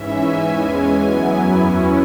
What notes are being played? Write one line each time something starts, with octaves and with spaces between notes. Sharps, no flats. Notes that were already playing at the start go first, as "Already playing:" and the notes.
Already playing: G#2 E3 C#4 E5
G#5
E2 E3 G#3 C#4
F#2 F#3 B3 E4
E2 E3 C#4 E4